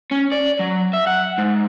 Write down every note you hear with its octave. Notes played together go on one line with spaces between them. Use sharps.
C#4
D5
F#3
E5
F#5
G#2